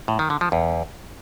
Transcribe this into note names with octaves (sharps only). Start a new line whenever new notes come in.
A2
D#3
D3
F3
E2